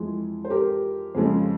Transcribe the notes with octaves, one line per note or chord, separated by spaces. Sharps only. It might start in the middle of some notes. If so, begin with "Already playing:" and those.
Already playing: F2 E3 G#3
C5
G4 A#4
F2 C#3 F3 G#3